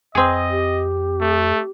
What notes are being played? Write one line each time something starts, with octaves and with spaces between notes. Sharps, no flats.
F2 C4 G#4 D#5
G4
A3